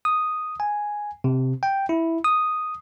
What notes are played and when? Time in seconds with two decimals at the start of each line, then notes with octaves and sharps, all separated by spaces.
0.05 D#6
0.60 G#5
1.24 C3
1.63 G5
1.89 E4
2.24 D#6